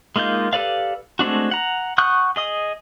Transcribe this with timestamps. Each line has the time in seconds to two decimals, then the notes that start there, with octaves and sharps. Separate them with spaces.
0.16 G#3 A#3 D#4 F4 G6
0.53 G4 A4 B4 D5 F5
1.19 G#3 A3 C4 D4 F#4
1.51 F#5 A#5
1.98 F#5 C#6 D#6 F#6 G6
2.36 G#4 D#5 D#6